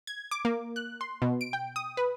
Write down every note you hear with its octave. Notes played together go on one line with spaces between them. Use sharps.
G#6
D6
A#3
F#6
C6
B2
D7
G5
D#6
B4